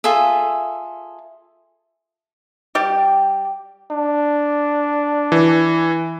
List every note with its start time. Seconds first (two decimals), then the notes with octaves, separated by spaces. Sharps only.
0.04 F4 G#4 A4 E5
2.75 G3 G4
3.91 D4
5.32 E3